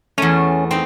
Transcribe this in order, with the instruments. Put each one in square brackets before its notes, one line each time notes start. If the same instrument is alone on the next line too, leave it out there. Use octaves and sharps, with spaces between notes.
[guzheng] E2 A3 [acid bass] C#4
[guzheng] C4 D#4